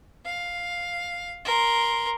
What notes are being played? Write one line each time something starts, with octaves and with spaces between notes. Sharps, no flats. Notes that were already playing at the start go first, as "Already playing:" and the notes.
F5
A#4 C6